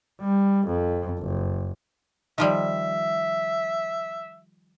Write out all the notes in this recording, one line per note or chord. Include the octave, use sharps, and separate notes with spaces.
G3
F2
F#1
D#3 F3 G3 E5